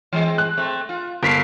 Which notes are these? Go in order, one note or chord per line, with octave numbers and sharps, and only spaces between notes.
E3 G#3 C4
F#6
A3 C4
F4
G1 A4 A#4 B6 C7